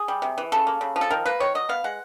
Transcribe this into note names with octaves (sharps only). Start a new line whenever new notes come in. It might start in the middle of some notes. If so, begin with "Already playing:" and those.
Already playing: G#4
G3
C3
E3
C#3 A4
A#3
C#3
F3
A4
D#3 A#4
A#3 B4
D#3 C#5
F#3 D#5
B3 F5
G#3 F#5